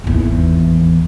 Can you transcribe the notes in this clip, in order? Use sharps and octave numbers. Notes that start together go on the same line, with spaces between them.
G#1 E2